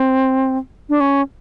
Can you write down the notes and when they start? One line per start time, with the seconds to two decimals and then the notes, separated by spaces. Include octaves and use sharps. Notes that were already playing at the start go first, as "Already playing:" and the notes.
Already playing: C4
0.89 D4
1.00 C#4